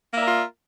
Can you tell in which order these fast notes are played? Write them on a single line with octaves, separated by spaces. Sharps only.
A#3 E5 D5 A#4 F4